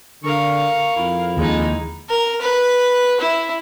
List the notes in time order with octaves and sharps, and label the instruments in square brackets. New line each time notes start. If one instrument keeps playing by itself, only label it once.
[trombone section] D3 [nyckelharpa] A#4 F5 [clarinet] C#6
[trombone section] F2 [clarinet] E4
[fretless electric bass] D#2 [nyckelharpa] G#3 D#4
[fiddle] A#4
B4
E4